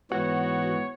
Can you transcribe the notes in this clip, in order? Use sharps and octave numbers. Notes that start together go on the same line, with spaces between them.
G#2 E3 B3 F#4 C#5